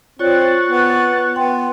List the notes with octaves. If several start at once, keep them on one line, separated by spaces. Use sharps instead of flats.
C4 F4 C#5 D5 C#6 F#6 A6
B3
B3 G5 C6